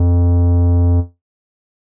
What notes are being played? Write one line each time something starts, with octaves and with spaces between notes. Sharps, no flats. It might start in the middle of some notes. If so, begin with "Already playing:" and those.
Already playing: F2